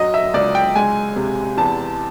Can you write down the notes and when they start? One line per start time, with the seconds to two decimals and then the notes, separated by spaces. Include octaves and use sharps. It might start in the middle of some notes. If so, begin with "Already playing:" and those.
Already playing: F#2 F#3 D#5
0.14 E5
0.34 C#2 D5
0.55 G5
0.75 G#3 G#5
1.16 C3
1.58 E2 A5